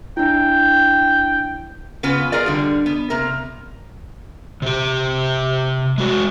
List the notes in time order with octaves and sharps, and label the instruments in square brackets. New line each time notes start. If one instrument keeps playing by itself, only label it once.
[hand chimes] D4 E4 [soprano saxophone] G5
[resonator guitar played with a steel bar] C#3 B3 F4 B4
F4 G#4 A#4 D5
D3 G3
B3
C3 A#3 A#4
[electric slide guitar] C3 G4
G#3 F#4